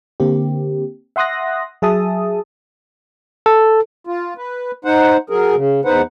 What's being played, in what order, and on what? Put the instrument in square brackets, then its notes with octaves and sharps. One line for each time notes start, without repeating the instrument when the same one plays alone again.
[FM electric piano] D3 A#3 C4 G4
E5 F#5 C6 D#6 F#6 A#6
F#3 G#4 E5 A5 D#6
[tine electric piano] A4
[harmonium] F4
B4
D#4 C5 F#5
F#3 G#4 A#4
C#3
E2 D#4 B4 C5 F#5